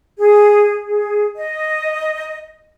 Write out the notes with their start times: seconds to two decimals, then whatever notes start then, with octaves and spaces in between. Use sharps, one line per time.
0.19 G#4
0.87 G#4
1.37 D#5